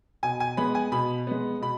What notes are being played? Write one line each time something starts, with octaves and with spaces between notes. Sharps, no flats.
B2 G#5
G#5
G#3 B3 B5
G#5
B2 B5
G#3 B3
B2 B5